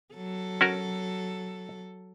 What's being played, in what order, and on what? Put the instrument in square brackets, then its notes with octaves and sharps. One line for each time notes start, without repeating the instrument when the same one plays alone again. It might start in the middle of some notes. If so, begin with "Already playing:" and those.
[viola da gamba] F#3 A4
[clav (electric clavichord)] C#4 F#4 A#4